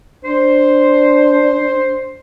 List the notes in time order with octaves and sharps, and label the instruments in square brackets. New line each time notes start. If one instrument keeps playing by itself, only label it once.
[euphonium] D4 [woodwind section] C5